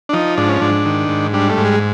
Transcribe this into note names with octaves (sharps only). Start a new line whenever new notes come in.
D4
F3 D#4
G#2 D4
C#4
G#2 D4
D#3
G#2
G3 D4
A3
G#2
G#3